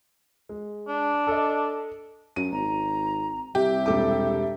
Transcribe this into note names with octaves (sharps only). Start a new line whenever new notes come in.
G#3
D4
A4 D#5
F#2 D#7
G#1 A#5
C2 G4 E5
E1 A4 D6